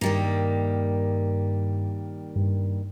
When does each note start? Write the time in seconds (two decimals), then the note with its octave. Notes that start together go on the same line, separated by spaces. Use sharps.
0.01 G2 D#3 G3 A#3
2.36 G2